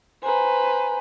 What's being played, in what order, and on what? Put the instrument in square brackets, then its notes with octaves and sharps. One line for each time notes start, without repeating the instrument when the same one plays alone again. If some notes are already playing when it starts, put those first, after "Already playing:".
[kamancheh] B4 C5 [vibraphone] G#5 A#5